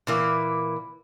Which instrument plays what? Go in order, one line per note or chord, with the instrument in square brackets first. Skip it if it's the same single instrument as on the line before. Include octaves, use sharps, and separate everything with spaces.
[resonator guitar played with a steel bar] A#2 E3 A#3